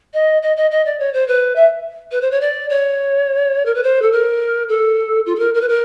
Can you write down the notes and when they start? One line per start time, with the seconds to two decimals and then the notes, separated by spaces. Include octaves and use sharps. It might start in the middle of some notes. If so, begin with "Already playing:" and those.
0.13 D#5
0.42 D#5
0.56 D#5
0.71 D#5
0.85 D5
0.99 C#5
1.13 C5
1.27 B4
1.55 E5
2.11 B4
2.21 C5
2.31 C#5
2.41 D5
2.69 C#5
3.65 A#4
3.74 B4
3.83 C5
4.02 A4
4.12 A#4
4.69 A4
5.26 F4
5.35 A4
5.39 A#4
5.54 A#4
5.61 B4
5.68 A#4